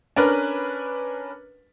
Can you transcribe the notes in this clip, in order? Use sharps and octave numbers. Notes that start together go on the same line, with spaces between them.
C#4 D4 A#4 B4